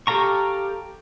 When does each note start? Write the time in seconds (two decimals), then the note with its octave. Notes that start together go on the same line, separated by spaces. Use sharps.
0.07 G4 A4 F5 A#5 C#6